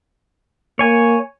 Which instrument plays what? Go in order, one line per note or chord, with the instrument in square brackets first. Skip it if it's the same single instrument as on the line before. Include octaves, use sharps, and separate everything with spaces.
[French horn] A#3 [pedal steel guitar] C#5 G#5